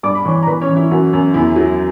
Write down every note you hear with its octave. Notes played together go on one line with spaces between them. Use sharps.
G2 D5 D6
B5
E3 C#5 C#6
A#5
E3 B4 B5
C#4 C#5
E3
E4
F#2 F#4
F#2
E2 E4
F#3